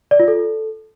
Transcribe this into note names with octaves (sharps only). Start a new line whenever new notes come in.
D5
F4
A4